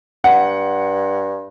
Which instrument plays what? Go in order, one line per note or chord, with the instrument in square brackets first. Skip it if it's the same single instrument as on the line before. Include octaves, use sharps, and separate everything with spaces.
[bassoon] G2 [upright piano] F#5